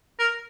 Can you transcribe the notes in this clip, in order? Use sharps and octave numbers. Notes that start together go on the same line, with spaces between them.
A#4